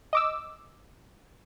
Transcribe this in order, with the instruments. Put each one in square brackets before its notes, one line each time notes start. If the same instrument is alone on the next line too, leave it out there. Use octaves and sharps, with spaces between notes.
[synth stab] D#5 D6 E6